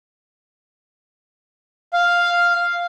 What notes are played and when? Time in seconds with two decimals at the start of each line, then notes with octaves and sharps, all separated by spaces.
1.93 F5